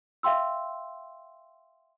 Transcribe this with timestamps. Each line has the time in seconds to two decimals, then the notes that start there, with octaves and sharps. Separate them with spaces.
0.23 E5 F5 G5 C6 E6